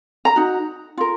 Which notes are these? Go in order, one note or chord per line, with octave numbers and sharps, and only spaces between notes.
A#5
D#4 F#4
F4 A#4